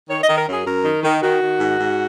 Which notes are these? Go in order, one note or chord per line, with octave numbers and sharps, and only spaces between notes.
D#3 C#5
D#5
D#3
A#4
F#2 G#4
F#2 A#4
D#3
D#3
D#3 F#4
D#3
G#2
G#2